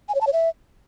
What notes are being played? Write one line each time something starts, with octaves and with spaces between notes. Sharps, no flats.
G#5
C#5
A5
C#5
E5